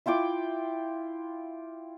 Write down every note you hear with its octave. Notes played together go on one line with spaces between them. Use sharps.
E4 F4 G5 D6